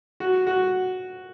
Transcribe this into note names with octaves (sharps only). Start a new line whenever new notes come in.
F#4
F#4